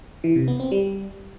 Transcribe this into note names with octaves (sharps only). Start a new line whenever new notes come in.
E3
C3
B3
C4
G3